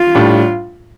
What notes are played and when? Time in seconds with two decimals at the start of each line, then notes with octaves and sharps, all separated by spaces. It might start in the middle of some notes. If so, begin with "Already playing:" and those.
Already playing: F4
0.15 A2 G3 D4